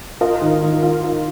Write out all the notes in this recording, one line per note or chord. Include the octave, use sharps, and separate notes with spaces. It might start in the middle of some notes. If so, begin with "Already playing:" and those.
F4 A#4 D#5
D#3
D#3
F4
F4